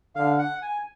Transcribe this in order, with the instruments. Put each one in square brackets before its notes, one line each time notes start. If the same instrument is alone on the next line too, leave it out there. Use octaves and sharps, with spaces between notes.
[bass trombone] D3 [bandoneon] F5
[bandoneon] F#5
G#5